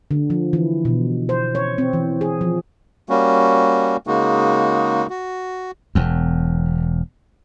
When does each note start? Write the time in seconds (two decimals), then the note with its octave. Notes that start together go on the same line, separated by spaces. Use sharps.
0.11 D3
0.30 F3
0.53 E3
0.85 B2
1.29 C5
1.55 C#5
1.78 C4
1.93 E3
2.21 G#4
2.41 F3
3.09 G3 A#3 C#4 F#4
4.07 C#3 G#3 A#3 D#4 F#4
5.10 F#4
5.95 E1 E2